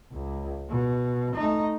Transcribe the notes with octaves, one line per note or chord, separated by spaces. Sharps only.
C#2
B2
A3 D#4